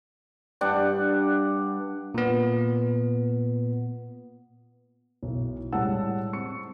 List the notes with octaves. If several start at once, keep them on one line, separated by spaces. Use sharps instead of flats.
G2 D4 F#5 G5
A#2 B3
B1 E4
A2 G3 G#3 F#5 A5 E6
C4 C#6 C#7